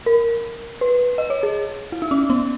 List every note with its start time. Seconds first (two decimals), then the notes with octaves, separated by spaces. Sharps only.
0.06 A#4
0.81 B4
1.18 D#5
1.30 C#5
1.43 G#4
1.92 E4
2.02 D#4
2.11 C#4
2.30 B3